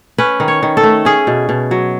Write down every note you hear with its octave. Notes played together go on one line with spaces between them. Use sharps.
C#4 B4
D#3
C#5
D#3
A4
A3
C#4 G#4
B2
B2
F#3